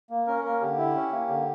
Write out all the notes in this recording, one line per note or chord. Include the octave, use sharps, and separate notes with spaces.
A#3
C#4 A#4
A#3 A#4
D3 G4
E4
C#4
A#3
D3